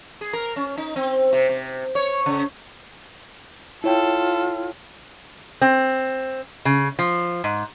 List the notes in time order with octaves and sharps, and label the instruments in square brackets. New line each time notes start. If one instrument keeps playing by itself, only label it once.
[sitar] G#4
A#4
C#4
D#4
C4
C3
C3
C#5
C#3
[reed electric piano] E4 C#5 G5 [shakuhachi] F4 [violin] A4
[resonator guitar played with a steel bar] C4
C#3
F3
G#2